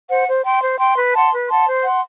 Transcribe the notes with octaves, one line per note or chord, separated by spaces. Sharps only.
C5 F#5
C5
G5 C6
C5
G5 C6
B4
F#5 A5 C6
B4
F#5 A5 C6
C5
F#5 C6